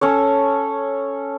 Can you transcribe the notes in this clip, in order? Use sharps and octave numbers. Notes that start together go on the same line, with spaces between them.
C#4 A4 C#5